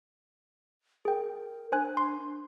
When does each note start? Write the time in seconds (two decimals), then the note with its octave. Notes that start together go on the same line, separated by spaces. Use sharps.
1.05 G#4 A#4 G5
1.72 D4 C5 G#5 F#6
1.97 C6